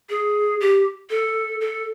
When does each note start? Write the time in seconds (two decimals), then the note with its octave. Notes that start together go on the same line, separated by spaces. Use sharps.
0.10 G#4
0.61 G4
1.10 A4
1.61 A4